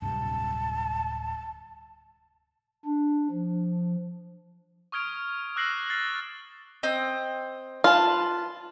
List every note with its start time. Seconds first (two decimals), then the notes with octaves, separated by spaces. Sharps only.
0.02 D1 G2 C3 A5
2.85 D4
3.30 F3
4.92 C#6 D#6 F6 G#6 D7 F7
5.56 D6 E6 F#6 A#6 C7 F#7
5.90 F6 A6 C7
6.83 C4 D#5
7.84 F4 B4 A5